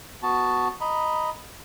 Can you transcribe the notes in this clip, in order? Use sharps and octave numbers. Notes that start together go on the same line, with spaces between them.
B3 F#4 A5
D#5 A#5 B5